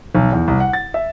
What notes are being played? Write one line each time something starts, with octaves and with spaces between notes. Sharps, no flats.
B1
E2
C2
F#5
A6
E5